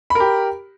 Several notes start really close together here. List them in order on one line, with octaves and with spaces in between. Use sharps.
B5 A#4 G4